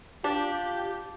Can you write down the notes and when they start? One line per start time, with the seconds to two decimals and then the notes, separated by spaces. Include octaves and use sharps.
0.24 D4 F4 G4